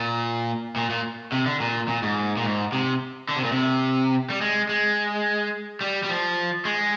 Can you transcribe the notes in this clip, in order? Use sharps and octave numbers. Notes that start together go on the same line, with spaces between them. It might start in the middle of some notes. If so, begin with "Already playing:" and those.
Already playing: A#2
A#2
A#2
C3
D3
A#2
A#2
G#2
A#2
G#2
C3
D3
C3
A#2
C3
G3
G#3
G#3
G3
G3
F3
G#3